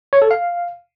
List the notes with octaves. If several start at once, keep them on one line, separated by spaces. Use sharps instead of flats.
C#5
A4
F5